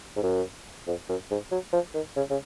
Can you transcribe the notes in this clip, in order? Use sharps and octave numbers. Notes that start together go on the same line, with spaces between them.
G#2
F#2
F2
F#2
G#2
F#3
F3
D#3
C#3
C#3